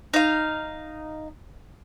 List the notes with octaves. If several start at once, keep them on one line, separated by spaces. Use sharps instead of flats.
D#4 F5